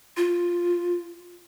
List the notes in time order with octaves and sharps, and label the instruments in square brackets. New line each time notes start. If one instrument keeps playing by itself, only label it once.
[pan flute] F4